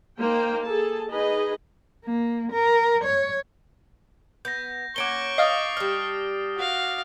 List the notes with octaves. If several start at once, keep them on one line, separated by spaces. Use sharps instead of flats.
A#3 D#4 C5 G5
G#4 A4 A5
D#4 G#4 B4 D#5
A#3
A#4
C#5
B3 G6 A#6
A#3 C#4 F#5 C#6 D6 D7 G7
D#5 F5 D#6 A6 C7
G3 D4 F6
F#4 F5